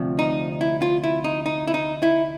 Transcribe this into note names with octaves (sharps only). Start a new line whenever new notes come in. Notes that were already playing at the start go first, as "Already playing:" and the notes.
Already playing: D2 C3 F3
D#4
E4
F4
E4
D#4
D#4
E4
D#4
E4